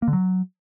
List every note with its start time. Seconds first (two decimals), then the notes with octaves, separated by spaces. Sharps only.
0.02 A#3
0.08 D3
0.13 F#3